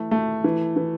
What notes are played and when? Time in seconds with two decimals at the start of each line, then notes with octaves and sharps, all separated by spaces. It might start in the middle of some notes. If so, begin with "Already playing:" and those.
Already playing: E3 A3
0.11 A3
0.44 E3
0.76 E3